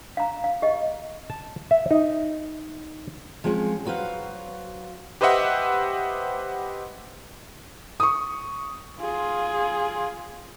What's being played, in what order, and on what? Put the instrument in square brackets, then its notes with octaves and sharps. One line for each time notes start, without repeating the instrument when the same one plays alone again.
[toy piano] F5 A#5
F5
G4 D#5
[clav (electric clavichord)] A5
E5
D#4
[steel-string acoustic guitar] F3 G#3 C4 C#4
F#3 F#4 B4 C5 F5
[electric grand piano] G4 B4 C5 D#5 E5 F#5
[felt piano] C#6 D#6
[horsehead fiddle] F4 G#4